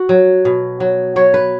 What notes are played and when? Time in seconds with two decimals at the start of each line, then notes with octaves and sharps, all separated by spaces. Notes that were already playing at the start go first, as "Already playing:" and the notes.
Already playing: F#4
0.09 F#3
0.45 B2
0.80 F#3
1.16 F#3 C#5
1.34 B4